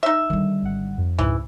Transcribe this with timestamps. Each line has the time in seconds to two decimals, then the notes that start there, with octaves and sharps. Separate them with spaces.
0.03 D#4 E5
0.30 D3 D#3 G3
0.62 G#1 F#5
0.98 F2
1.19 C#2 G#2 E3 C#4